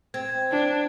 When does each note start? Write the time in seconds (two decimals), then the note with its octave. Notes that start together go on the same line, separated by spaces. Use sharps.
0.14 C4 G#6
0.51 D4